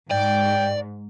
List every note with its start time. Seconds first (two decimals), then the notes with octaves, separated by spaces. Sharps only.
0.11 G#2 D5 G5